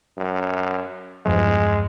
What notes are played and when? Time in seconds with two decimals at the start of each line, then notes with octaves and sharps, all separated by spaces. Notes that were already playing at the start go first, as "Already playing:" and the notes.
0.18 F#2
1.26 E2 G2 F3 G#3